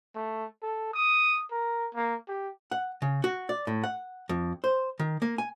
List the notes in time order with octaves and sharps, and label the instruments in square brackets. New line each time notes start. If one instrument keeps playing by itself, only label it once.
[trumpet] A3
A4
D#6
A#4
A#3
G4
[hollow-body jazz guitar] F#5
C#3
F#4
D5
A2
F#5
F2
C5
D#3
A#3
G#5